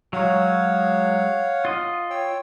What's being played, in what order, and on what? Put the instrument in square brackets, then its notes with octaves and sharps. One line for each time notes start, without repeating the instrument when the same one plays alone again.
[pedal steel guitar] F#3 G#3 [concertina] C#5 F5 F#5
[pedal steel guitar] F4 D#5
[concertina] C#5 G5 E6